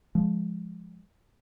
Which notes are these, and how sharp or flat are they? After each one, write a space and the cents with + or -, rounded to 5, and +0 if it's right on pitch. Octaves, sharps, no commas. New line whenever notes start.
F3 +0 G#3 +0